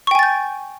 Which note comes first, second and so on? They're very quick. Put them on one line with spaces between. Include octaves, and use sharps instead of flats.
C#6 G5 G#5 A6 G6